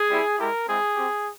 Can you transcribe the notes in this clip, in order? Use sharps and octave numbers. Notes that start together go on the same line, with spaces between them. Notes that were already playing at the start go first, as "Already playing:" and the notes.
Already playing: G#4
G3 C4 E4
G#3 E4 G4 A#4
G#3 C4 E4 G#4
C4 G4